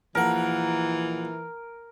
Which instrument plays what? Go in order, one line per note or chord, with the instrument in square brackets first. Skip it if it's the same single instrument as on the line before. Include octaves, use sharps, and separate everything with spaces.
[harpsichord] A#1 F#5 [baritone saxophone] E3 [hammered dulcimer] A#4